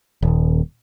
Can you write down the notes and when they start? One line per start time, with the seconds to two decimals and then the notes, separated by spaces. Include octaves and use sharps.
0.22 D#1